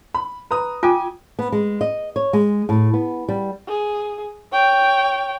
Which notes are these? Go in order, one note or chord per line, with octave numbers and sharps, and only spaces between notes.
B5
B4 A#5 D#6
F4 G5 G#5 D6
B3
G#3
D#5
C#5
G#3
A2
B3
G3
G#4
C#5 G5